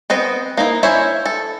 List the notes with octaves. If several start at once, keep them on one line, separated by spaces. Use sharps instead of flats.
B3 C4 D#5
A#3 D#4 E4
C#4 E4 C5 C#5 E5
A4